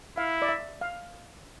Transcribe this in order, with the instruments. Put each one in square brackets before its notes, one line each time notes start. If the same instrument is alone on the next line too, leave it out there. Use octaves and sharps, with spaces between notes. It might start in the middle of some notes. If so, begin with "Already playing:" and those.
[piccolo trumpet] E4 [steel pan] F5
[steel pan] D5
E5
F5